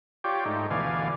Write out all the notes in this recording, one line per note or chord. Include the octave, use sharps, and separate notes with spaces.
F4 G4 C#5 D5 G5
G#2 A3 D#4
D2 B2 E3 D5 F5 G#5